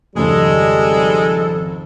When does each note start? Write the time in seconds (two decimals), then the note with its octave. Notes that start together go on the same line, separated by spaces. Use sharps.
0.15 G#1 F2 C#3 G3 G#3 A4